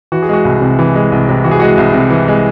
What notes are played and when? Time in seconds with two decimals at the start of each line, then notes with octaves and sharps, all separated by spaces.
0.12 E3 F#4
0.22 G#4
0.29 G#3 F#4
0.45 C2
0.61 C3
0.79 E3
0.95 G#3
1.12 C2
1.29 C3
1.44 E3 F#4
1.51 G#4
1.59 G#3 F#4
1.78 C2
1.94 C3
2.10 E3
2.28 G#3